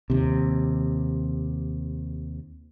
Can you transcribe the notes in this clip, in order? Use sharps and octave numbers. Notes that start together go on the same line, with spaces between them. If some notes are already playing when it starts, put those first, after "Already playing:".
D#2 C3